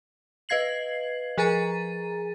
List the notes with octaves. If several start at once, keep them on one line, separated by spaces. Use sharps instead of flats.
B4 D#5 F5 G#6 C7 F#7
F3 G#4 G#5 A#5 A6 D#7